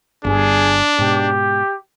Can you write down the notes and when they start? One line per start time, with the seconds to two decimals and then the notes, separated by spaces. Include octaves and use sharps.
0.25 G1 G2 D4 G#4
0.99 G#2 B2 G4